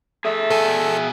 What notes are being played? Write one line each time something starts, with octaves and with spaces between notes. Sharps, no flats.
A3 G#4 E5
B2 A4 G#5